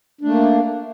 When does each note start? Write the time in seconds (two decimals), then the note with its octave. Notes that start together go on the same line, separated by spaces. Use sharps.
0.21 D4
0.25 A3
0.28 A#3